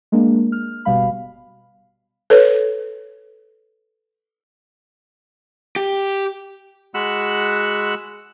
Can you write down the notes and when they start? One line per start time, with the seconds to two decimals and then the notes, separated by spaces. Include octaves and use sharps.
0.12 G#3 A#3 D4
0.52 F6
0.85 G1 B2 G3 F5 B5
2.30 A4 B4 C#5
5.76 G4
6.94 G#3 F#4 F#5 B5 E6 F#6